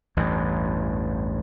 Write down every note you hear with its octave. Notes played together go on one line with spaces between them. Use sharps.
A1 E2 G2